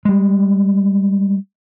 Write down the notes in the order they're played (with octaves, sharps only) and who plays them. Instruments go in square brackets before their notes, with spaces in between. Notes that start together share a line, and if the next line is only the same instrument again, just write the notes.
[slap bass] G3 G#3